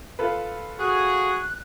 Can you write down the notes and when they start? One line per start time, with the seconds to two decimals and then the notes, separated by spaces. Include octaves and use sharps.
0.19 F4 A4 B4
0.80 F#4 G#4 F#6